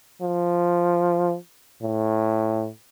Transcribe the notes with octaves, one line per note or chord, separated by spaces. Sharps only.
F3
A2